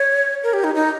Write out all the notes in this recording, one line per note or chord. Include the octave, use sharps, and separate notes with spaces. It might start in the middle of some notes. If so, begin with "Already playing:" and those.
Already playing: C#5
A#4
G4
D#4
D#4